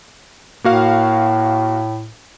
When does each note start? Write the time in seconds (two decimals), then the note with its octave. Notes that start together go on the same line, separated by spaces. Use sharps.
0.64 A2 A#3 F#4 F5